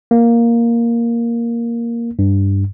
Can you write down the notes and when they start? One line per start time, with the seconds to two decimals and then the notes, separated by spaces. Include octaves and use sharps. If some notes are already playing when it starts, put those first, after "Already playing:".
0.11 A#3
2.19 G2